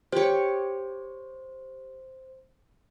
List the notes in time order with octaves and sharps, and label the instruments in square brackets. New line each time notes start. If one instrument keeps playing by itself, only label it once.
[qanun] G4 C#5 [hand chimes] C5